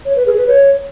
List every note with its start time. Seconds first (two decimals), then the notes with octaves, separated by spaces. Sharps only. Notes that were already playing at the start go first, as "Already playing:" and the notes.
0.05 C#5
0.16 B4
0.26 G#4
0.37 B4
0.48 C#5